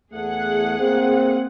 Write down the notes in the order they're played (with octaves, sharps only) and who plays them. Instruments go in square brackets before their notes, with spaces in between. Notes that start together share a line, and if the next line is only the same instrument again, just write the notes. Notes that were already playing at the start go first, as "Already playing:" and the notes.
[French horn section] E2 A3 [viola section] G#4 F#5
[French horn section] A#3 C4